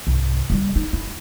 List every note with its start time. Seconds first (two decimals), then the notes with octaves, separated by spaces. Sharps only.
0.07 C2 G#2
0.50 C#3 G3
0.76 D#4
0.93 E4